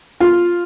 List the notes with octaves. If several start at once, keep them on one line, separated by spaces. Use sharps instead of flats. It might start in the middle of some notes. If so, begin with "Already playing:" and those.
F4